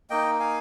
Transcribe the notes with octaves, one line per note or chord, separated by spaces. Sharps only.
A#3 D#4 D#5 G5
F5 G#5